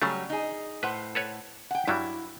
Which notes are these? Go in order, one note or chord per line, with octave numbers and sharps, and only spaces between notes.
C#3 F#3 G3 A3 C#5
D#4 G#4
A2 B4 C5 F#5
A4 B4 C#5
F#5 G5
G2 F#3 G3 E4